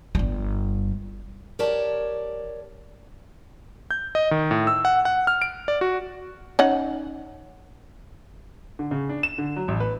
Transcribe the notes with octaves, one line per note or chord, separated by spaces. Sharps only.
G1 G3
G4 A#4 C#5 D5 A5
G6
D#5
D#3
A2
E6
F#5
F#5
F6
D7
D5
F#4
C#4 D#4 F#5
D3
C#3
D4
E7
D3
F#3
A1
B4